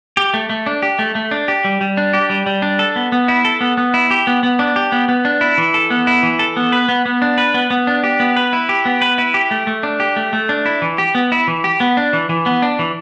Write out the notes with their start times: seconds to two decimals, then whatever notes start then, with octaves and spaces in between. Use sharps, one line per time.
0.17 G4
0.34 A3
0.50 A3
0.66 D4
0.83 G4
0.99 A3
1.15 A3
1.31 D4
1.48 G4
1.65 G3
1.81 G3
1.97 D4
2.13 G4
2.30 G3
2.46 G3
2.62 D4
2.79 A4
2.96 B3
3.12 B3
3.28 E4
3.45 A4
3.61 B3
3.78 B3
3.94 E4
4.11 G4
4.27 B3
4.43 B3
4.59 D4
4.76 G4
4.92 B3
5.09 B3
5.25 D4
5.41 E4
5.58 E3
5.74 A4
5.90 B3
6.07 E4
6.23 E3
6.39 A4
6.57 B3
6.72 B4
6.89 B3
7.06 B3
7.22 D4
7.38 B4
7.54 B3
7.70 B3
7.87 D4
8.04 G4
8.20 B3
8.36 B4
8.53 E4
8.69 G4
8.85 B3
9.01 B4
9.18 E4
9.34 G4
9.51 A3
9.67 A3
9.83 D4
10.00 G4
10.16 A3
10.33 A3
10.49 D4
10.66 E4
10.82 E3
10.98 G4
11.15 B3
11.32 E4
11.48 E3
11.64 G4
11.80 B3
11.97 D4
12.13 E3
12.29 E3
12.46 B3
12.62 D4
12.79 E3